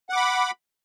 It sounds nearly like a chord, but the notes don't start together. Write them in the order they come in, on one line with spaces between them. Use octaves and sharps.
F#5 D6 B5